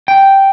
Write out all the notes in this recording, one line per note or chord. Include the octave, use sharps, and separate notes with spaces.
G5